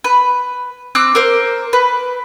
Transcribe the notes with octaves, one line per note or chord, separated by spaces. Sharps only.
B4
C4 D6 E6 F#6
A#4 C5
B4